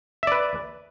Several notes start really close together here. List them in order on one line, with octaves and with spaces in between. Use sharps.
E5 D5 B4